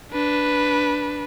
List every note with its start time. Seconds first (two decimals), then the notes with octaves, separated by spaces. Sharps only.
0.12 D4 B4